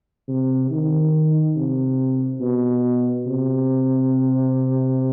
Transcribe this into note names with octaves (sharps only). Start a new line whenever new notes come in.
C3
D#3
C3
B2
C3